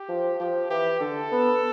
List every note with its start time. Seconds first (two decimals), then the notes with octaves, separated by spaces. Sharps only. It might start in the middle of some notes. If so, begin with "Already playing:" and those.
Already playing: G4
0.09 F3
0.40 F3 G4
0.70 E3 G4
1.01 D3 A4
1.31 B3